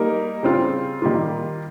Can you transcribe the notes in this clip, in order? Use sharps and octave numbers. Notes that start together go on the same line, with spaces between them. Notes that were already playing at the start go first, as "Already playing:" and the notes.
Already playing: G3 A#3 D#4 A#4
C#3 G3 C4 F4
D#3 G3 A#3 F4